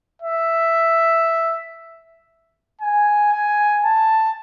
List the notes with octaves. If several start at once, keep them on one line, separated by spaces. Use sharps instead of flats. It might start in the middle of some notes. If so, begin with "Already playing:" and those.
E5
G#5
G#5
A5